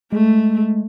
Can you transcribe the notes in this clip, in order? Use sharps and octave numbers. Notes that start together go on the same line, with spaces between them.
G#3 A3